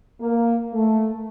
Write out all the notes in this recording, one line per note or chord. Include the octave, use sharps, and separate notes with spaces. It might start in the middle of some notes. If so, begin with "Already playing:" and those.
A#3
A3